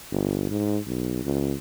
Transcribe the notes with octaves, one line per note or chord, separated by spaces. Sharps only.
G1
G#2
B1
C#2